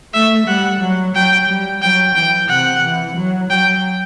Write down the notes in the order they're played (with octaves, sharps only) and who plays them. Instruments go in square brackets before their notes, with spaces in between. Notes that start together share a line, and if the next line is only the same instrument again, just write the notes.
[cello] A3 [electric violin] E5
[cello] G3 [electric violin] F#5
[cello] F#3
[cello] F#3 [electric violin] G5
[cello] G3
[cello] F#3 [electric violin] G5
[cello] E3 [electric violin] G5
[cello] C3 [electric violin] F#5
[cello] E3
F#3
[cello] F#3 [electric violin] G5